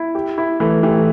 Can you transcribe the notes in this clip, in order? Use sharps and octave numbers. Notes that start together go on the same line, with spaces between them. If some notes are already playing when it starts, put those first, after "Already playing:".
Already playing: E4
G4
E4
E3 A3 E4
E3 A3 G4